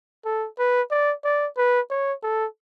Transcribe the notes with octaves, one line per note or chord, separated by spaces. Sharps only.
A4
B4
D5
D5
B4
C#5
A4